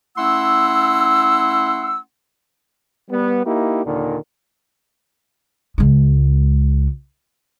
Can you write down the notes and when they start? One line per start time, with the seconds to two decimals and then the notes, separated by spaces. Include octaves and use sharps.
0.17 A3 C#4 E4 F#5 C6 E6
3.09 G3 B3
3.45 A#3 D#4 E4 G4
3.85 D#2 A#2 D3 D#3
5.78 C#2 G#3